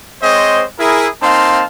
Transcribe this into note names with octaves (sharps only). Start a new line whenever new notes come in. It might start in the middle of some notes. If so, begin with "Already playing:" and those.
G#3 C4 C5 C#5 D#5
E4 G#4 A#4
A#3 C4 D#4 F5 A5 C6